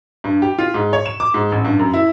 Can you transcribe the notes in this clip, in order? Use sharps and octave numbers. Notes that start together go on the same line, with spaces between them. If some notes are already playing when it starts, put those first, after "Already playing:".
G2
G4
F4
G#2
C#5
E7
D6
G#2
A1
G2
F#2
E4